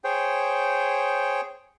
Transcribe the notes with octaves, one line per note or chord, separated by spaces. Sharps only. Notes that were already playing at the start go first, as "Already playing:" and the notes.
G#4 C5 C#5 G5